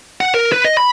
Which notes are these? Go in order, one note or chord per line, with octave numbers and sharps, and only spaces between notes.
F#5
A#4
B4
D#5
B5